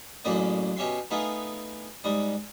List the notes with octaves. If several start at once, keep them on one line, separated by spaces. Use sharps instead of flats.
A1 F#2 C#3 A#3 D5 D#5
B2 C#4 G4 E5 C6
A3 B3 D#4 F4 G#4
G#2 G3 D#5